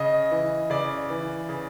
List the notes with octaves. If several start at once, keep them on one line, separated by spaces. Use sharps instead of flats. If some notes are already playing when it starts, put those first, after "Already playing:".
Already playing: C#3 D#5
E3
C#3 D5
E3
C#3